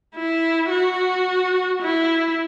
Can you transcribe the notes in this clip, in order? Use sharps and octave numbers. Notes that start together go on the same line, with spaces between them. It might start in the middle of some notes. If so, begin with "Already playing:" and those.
E4
F#4
E4